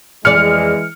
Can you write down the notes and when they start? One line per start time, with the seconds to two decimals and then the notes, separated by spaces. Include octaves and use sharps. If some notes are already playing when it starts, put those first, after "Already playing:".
0.25 F2 E3 G#3 G#4 D5 F6 C#7